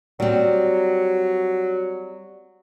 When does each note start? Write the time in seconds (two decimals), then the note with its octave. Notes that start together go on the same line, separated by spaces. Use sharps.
0.20 F#3 G3 C4